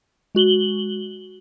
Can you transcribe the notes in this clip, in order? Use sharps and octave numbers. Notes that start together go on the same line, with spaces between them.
G#3 F#4 F#7 G7